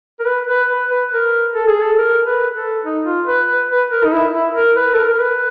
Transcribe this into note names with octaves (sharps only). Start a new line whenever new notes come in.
A#4
B4
B4
B4
B4
A#4
A4
G#4
A4
A#4
B4
A4
D#4
F4
B4
B4
B4
A#4
D#4
E4
E4
A#4
B4
A4
A#4
A#4
B4